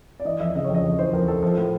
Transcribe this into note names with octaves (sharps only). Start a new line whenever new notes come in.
D5
E3 D#5
F2 E5
C#3 D#5
C#5
F2 D#5
F2 C#5
E3 C5
F2 A#4
F2 A4
F3
A2